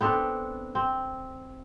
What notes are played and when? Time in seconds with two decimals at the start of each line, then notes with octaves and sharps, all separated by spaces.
0.01 B3 C4 D4 A4
0.75 C4